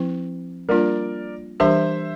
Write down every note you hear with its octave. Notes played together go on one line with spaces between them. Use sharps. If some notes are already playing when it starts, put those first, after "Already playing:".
Already playing: F3 C4 E4
G3 A#3 D4 F4 A#4 D5
E3 G3 D4 G4 A#4 C5 E5